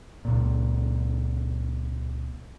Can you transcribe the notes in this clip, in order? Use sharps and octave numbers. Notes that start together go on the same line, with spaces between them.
C#2 A#2